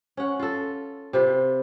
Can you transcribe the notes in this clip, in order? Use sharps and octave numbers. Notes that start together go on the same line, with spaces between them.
C#4 F#5
F4 A4
C3 F4 B4